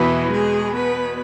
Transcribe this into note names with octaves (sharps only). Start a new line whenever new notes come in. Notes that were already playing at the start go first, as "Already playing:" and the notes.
Already playing: E2 B2 E3 B3 E4 F#4 B4
G#3 G#4
B3 B4